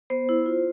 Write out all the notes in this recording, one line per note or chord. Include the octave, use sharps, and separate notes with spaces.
B3 C5
E4
F4